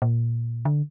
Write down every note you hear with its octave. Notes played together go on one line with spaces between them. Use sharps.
A#2
D3